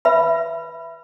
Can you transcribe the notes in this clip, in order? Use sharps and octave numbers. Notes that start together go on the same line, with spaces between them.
B4 E5 B5